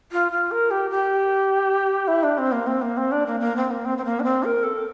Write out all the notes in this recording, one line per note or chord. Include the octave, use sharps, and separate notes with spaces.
F4
F4
A#4
G4
G4
E4
D4
C4
A#3
C4
A#3
C4
D4
A#3
A#3
C4
A#3
C4
C4
A#3
D4
C4
A#4
A4